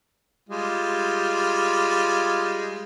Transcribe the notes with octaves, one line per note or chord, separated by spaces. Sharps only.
G3 G#3 F4